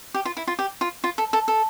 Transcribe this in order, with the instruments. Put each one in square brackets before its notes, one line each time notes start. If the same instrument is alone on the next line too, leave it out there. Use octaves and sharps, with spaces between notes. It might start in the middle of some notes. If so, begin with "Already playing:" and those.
[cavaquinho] G4
F4
E4
F4
G4
F4
F4
A4
A4
A4